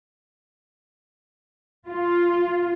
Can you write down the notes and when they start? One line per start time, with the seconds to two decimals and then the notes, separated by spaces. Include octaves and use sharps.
1.87 F4